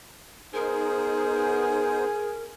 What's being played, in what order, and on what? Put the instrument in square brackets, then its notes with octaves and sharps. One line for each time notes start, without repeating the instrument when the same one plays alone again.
[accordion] B3 D#4 C5 [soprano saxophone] G#4 [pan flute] A#4